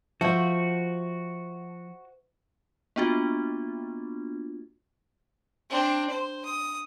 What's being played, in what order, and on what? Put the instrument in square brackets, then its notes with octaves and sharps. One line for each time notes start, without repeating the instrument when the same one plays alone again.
[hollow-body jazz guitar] F3 [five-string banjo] A3 F4 [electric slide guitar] F#4 [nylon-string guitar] C5 E5
[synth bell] A#3 B3 D4 F4 F#4
[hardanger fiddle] C4 D4
C5
D#6